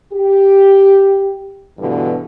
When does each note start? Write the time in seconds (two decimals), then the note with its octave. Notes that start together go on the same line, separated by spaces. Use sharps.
0.12 G4
1.79 D2 G2 B2 D3 E3